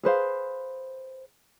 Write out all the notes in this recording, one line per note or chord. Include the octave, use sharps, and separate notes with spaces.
G#4 B4 C5 F5